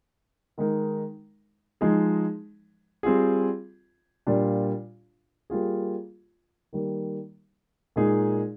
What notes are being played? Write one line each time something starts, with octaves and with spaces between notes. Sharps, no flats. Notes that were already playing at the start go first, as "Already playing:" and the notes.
D#3 G#3 D#4 A#4
F3 G#3 D#4 G#4
G3 C4 F4 G#4
A#2 G3 D4 F4
G3 A#3 F4 G#4
D#3 G3 A#3
A#2 G#3 D#4 G#4